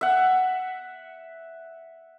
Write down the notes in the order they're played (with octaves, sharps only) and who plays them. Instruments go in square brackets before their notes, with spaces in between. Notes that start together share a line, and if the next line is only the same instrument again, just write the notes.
[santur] E5 F#5